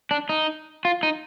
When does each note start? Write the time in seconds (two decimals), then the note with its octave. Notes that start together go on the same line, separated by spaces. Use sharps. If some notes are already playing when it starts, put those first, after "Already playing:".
0.11 D4
0.29 D#4
0.85 F4
1.03 D#4